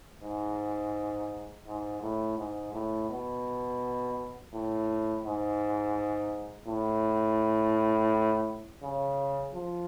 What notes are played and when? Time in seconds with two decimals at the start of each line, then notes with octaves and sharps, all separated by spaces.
0.23 G#2
1.67 G#2
2.02 A2
2.39 G#2
2.74 A2
3.10 B2
4.54 A2
5.25 G#2
6.67 A2
8.83 C#3
9.54 F3